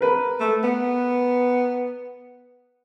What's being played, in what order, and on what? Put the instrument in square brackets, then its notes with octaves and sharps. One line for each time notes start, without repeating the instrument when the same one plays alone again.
[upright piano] A#4 B4
[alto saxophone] A3
B3